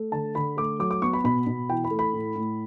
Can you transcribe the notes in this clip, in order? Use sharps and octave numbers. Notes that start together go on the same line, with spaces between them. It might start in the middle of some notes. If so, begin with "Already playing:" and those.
Already playing: A3
D3 A5
D3 B5
A3 D6
F#3 D6
D6
B3 C#6
B5
B2 B5
B2
E3 G5
B5
A3
B5
A2
A2